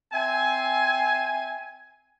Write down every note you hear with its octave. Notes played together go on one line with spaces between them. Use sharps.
C4 E5 G#5